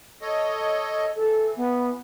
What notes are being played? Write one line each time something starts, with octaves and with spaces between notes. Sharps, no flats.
A4 C#5 D#5
E3 A4
B3